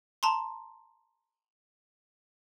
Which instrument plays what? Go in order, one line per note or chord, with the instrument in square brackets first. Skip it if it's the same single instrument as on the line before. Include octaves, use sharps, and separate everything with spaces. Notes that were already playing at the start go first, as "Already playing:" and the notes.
[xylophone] A5 A#5 C6